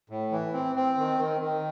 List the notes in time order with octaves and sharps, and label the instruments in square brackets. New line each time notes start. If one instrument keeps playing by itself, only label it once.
[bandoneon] A2
E3
C4
C4
D#3
D#3
D#3